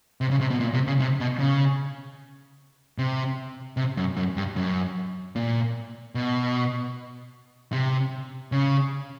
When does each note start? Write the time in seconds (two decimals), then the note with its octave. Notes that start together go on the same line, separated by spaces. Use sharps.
0.21 C3
0.31 C#3
0.41 C3
0.50 B2
0.60 A#2
0.74 C3
0.87 C#3
1.00 C3
1.20 B2
1.39 C#3
2.98 C3
3.77 C3
3.97 F#2
4.16 F#2
4.37 G2
4.56 F#2
5.36 A#2
6.15 B2
7.72 C3
8.52 C#3